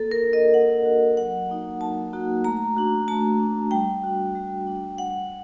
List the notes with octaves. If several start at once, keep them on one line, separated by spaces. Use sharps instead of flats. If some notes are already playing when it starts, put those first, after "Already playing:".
Already playing: A#3 A4
A#4
D4 F#4
D#5
A#3 F#5
D4 F#4
F#3 F#5
A#3 D#4 F#4
F#3 A5
A#3 D#4 F#4
A3 A#5
D4 F#4
A3 A5
D4 F#4
G3 G5
D4 F#4
G3
D4 F#4
G3 F#5